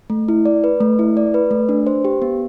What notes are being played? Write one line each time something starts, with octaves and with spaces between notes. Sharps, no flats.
A3
E4
D5
B4
A3
E4
D5
B4
A3
D4
C5
G4
B3